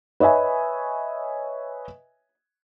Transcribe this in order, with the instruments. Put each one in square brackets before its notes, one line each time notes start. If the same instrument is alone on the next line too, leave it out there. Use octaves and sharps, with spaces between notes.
[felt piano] B4 C#5 D#5 E5 G#5